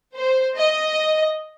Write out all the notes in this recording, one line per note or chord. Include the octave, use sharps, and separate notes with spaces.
C5
D#5